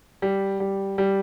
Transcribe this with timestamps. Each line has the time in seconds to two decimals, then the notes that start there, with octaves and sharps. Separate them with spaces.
0.22 G3
0.60 G3
0.98 G3